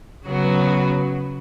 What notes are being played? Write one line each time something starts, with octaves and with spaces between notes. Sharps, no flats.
C#3 F#3 B3 F#4